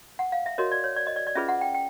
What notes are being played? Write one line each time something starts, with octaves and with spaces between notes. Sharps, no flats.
F#5
F5
E5
F#4 A#4 C#5 D#5
D5
C#5
D5
D#5
D5
D5
C#4 F4 G#4 B4 E5
F#5
G5
G5